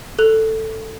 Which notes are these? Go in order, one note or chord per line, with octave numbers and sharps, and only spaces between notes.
A4 F#6 F7